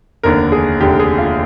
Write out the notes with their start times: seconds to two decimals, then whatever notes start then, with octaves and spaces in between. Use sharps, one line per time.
0.23 F1 D#2 D3 A#4
0.52 G#4
0.80 F1 D#2 D3 G4
0.99 G#4
1.18 F4